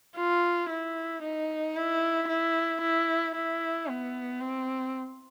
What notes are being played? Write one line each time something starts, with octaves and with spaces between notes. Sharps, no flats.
F4
E4
D#4
E4
E4
E4
E4
B3
C4